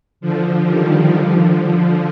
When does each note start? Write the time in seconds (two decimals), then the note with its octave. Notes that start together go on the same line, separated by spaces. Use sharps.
0.21 D3 F3
0.66 D#3 G3
1.11 D3 F3